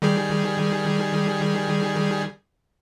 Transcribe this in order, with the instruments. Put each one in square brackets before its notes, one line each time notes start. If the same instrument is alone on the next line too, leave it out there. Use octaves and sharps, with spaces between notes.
[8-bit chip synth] D#3 G3 G#4